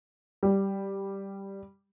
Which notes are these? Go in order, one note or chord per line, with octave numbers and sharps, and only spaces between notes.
G3